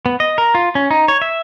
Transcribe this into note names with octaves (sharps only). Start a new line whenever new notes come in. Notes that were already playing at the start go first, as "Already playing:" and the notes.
B3
D#5
A#4
F4
C#4
D#4
C#5
E5